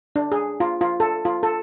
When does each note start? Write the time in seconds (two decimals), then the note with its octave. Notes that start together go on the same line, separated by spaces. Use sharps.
0.16 D4
0.32 G#4
0.60 F4
0.81 F4
1.00 A4
1.25 F4
1.43 A4